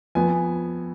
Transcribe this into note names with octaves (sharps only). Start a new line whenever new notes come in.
F2 F3 B3 G#5